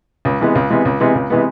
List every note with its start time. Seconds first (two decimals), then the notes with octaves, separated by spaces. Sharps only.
0.25 C#2
0.40 C3 E3 G#3 B3
0.55 C#2
0.70 C3 E3 G#3 B3
0.85 C#2
1.00 C3 E3 G#3 B3
1.15 C#2
1.30 C3 E3 G#3 B3